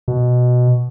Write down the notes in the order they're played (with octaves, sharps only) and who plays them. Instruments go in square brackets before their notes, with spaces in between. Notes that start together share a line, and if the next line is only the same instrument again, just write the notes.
[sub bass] B2